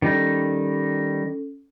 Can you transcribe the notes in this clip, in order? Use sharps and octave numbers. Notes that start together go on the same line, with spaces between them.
D#3 G3 C#4 D#4 A4